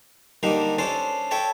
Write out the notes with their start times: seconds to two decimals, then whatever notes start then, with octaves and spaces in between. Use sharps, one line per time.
0.43 D3 G3 A#3 D4 D#4
0.78 C#4 D4 A4 C5 C6
1.31 A4 C#5 E5 G5 A5